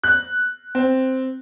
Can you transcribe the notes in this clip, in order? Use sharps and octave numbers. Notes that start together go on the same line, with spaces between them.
F#6
C4